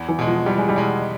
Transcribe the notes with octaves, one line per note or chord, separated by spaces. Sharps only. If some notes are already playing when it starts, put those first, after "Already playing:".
Already playing: E2
E3
B2 G#3
F3
E2 G3
G#3
G3
B2 G#3